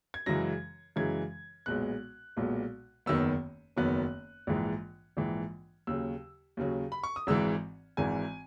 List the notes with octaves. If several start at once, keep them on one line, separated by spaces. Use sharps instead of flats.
G#6
F#2 C#3 E3 G#3 A#6
F#2 C#3 E3 G#3 G#6
B1 A#2 G#3 B3 F#6
B1 A#2 G#3 B3
F#1 E2 D#3 F#3 B3 E6
F#1 E2 D#3 F#3 B3 F#6
A#1 G#2 E3
A#1 G#2 E3
D#2 C#3 F#3 E6
D#2 C#3 F#3
B5
C#6
D#6
G#1 G#2 E3 E6
G#1 G#2 E3 G#5